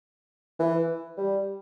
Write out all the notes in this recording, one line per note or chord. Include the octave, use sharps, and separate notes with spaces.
E3
G3